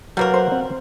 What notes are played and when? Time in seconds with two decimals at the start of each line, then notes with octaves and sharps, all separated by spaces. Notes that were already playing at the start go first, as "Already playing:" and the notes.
0.17 F#3 G3 A#3 A#4 B4 F#5
0.34 C5
0.52 C4